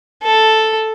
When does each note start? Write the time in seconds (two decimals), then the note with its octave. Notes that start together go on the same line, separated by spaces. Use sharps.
0.24 A4